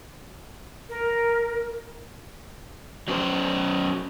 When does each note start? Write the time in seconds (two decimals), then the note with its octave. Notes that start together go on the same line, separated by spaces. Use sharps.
0.89 A#4
3.08 F#3 C#4 C5